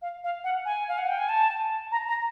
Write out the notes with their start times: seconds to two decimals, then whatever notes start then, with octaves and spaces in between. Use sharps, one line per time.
0.02 F5
0.24 F5
0.44 F#5
0.65 G#5
0.88 F5
0.98 F#5
1.08 G5
1.18 G#5
1.29 A5
1.92 A#5
2.08 A#5